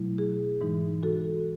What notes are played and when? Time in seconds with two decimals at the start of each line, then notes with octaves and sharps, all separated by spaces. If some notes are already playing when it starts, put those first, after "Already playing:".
Already playing: B2 F#3 A3 E4
0.18 G#4
0.61 G#2 E3 G#3 D#4
1.03 F#4 A4